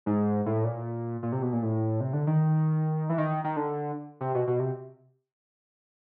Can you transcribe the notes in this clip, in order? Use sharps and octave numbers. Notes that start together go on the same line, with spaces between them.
G#2
A2
A#2
A#2
C3
B2
A#2
A2
C3
D3
D#3
E3
D#3
D#3
D3
C3
B2
B2
C3